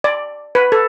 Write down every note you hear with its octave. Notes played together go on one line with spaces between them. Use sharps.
D5
B4
A4